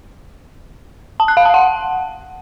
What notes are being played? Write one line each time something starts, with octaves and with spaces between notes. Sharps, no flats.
A5
F#6
F5
A5
F#5